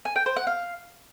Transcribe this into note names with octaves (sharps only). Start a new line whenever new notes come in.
G#5
G5
C5
F#5
F5